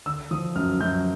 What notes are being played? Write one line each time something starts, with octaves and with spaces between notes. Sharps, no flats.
D3 E6
F3 D#6
F#2 F6
F#2 G6